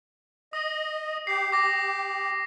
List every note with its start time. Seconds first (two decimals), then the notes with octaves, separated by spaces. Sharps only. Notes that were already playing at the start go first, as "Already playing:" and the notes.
0.53 D#5 D#6
1.27 G4 C7
1.52 G4 D6 A#6